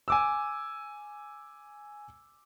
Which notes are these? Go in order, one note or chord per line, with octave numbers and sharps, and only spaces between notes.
G#5 D6 E6